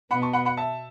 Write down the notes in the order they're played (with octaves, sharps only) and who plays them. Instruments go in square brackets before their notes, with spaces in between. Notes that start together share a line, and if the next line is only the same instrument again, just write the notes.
[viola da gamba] B2 B3 [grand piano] F#5 B5
[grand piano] A5 C#6
F#5 B5
F#5 B5
E5 A5